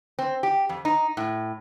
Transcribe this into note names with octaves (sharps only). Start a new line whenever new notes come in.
C4
G4
F2
D#4
A2